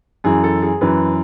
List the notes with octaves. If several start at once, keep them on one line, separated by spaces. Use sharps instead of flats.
F#2 E3 G#4
A4
G#4
F#2 E3 B4